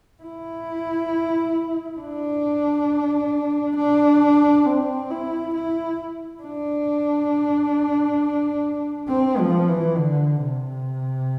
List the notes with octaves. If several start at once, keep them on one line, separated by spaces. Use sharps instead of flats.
E4
D4
D4
C4
E4
E4
D4
C4
F3
E3
D3
C3